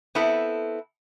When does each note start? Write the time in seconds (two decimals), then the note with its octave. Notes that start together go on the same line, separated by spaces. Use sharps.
0.15 B3 C4 E4 A4